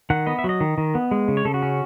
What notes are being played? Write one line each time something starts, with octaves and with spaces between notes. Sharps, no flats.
D#3 F#5
B3 D#5
E5
F#3 D#5
D#3
D#3
B3
G#3
C#3
C#5
C#3 A4
F#4
C#4